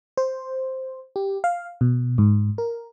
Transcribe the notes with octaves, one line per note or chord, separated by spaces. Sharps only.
C5
G4
F5
B2
G#2
A#4